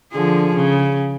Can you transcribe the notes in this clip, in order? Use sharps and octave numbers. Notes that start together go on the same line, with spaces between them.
D3 F3 G#4
C#3